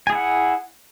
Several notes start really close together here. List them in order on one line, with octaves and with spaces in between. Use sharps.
G#5 G#4 E4 F#5